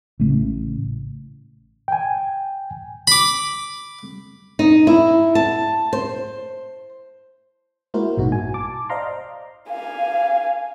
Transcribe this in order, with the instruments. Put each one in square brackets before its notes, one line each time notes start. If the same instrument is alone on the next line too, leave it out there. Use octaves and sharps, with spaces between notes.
[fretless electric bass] A1 C#3 A3
[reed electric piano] G5 G#5
[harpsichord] B5 D6
[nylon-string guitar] D#4
E4
A5
C5
[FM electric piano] G#3 A#3 E4 F#4 A#4 C5
A1 G2 B2 D#4 F#4
G#5
A5 D6
C5 D5 D#5 F5 A#5 C6
[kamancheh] F5 G#5